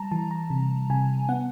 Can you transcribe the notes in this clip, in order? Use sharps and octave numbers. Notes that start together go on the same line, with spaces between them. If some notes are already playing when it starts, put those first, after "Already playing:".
Already playing: G3 A5 A#5
E3 A5
A#5
C3
C3 G#5
B3 F#5